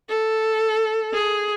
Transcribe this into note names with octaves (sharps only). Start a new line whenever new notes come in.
A4
G#4